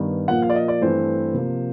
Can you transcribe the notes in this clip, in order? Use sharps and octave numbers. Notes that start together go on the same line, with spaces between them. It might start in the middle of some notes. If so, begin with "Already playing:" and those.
Already playing: G2 D#3 G3 B3
A#2 F3 A#3 F#5
F5
D5
D#5
D5
G2 E3 A3 C4 C5
C3 F3 A#3